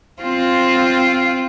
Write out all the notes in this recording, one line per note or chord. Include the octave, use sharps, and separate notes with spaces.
C4 F4